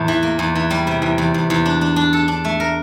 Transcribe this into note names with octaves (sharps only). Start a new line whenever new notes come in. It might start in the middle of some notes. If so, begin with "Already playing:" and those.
Already playing: E2 A2 A3
E3
A#3
E2
E3
G3
C3
E2
E2
E2
E2
D4
D4
D4
A4
D4
A3
A#4